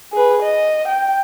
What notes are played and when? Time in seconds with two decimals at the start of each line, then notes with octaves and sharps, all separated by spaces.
0.13 G#4 B4
0.43 D#5
0.88 G5